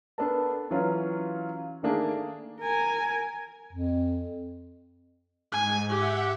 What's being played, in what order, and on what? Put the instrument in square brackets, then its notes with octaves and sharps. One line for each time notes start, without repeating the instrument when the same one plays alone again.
[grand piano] B3 D4 A4 A#4 A5
E3 F#3 C#4 F4
D#3 A3 A#3 D4 G#4
[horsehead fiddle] A#4 G#5
[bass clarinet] F2
[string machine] G#2 [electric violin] G#5
[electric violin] G4 [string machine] E5 F#5